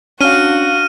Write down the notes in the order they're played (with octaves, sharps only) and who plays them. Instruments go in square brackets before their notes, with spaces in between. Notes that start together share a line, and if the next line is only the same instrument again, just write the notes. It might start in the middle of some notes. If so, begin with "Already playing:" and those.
[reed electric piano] C#4 [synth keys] D4 F5 [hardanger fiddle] F#4 [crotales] F6 D#7